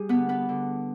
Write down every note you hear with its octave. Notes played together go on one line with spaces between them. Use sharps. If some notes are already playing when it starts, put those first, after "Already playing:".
Already playing: G3 G#4
D3 B3 B4
B3 B4
D3